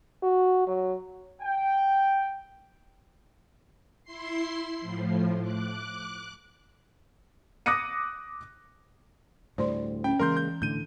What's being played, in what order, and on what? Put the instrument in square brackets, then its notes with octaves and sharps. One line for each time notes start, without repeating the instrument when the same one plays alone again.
[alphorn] F#4
F#3
[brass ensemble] G5
[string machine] E4 C6 C7
A2 F3
D6 F#6
[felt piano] D6 D#6 F#6 A#6 C#7 D#7
[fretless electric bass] D2 A2 G3 [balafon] C5 D5 C6
[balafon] C#4 [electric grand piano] G5
[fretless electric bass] C#3 G#3 A#3 [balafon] E3 [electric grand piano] A#4 C6 G6
[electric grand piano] G6
[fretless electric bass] A2 D3 [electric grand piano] G6 D#7